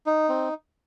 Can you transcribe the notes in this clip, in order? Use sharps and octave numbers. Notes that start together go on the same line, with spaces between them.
D#4
C4